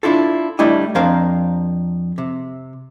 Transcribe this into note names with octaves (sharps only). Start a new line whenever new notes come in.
D4 E4 F4 A4
G3 A3 D4 E4 D#5
F2 D4 A#4 C5 F5
C3